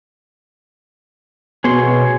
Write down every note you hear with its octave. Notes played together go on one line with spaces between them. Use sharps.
B2 G#4 C#5 C6